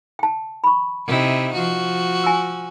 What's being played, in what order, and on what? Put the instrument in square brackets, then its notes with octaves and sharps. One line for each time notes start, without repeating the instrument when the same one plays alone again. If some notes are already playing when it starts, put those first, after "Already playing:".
[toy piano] G5 A5
B5 C#6
[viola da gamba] C3 D#4 E4
F3 F#4
[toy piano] G#5 E6